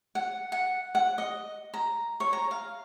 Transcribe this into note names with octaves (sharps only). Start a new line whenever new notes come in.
F#5
F#5
F#5
D#5
A#5
C#5
A#5
F5